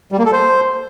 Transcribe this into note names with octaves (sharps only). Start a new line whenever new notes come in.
G3
A#3
A4
C5